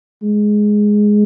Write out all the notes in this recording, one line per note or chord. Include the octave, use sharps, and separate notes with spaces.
G#3